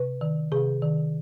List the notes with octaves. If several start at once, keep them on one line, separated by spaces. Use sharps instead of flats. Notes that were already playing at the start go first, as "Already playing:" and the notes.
Already playing: C3 B4
D#3
C3 G#4
D#3